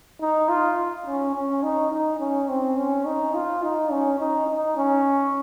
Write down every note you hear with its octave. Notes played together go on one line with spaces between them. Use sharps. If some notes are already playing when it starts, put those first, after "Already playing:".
D#4
F4
C#4
C#4
D#4
D#4
C#4
C4
C#4
D#4
F4
D#4
C#4
D#4
D#4
C#4